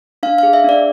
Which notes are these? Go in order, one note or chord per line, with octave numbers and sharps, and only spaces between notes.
D4 F5
F5
G#4
E5
D4 D5